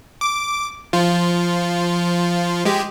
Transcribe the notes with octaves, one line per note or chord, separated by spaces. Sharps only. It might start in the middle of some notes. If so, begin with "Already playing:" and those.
D6
F3 F4
G#3 G4